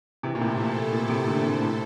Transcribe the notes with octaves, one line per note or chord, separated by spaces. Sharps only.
C3 E3 A3 E4 A4 C5
A#2
A2 C3
A#2
A#2
A2 C3
A#2 D3
A2 C3
A2 C3